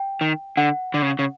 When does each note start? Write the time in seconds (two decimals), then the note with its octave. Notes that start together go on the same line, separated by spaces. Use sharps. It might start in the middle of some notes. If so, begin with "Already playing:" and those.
Already playing: G5
0.21 D#3
0.57 D3 F#5
0.94 D3
1.02 C#3
1.19 C#3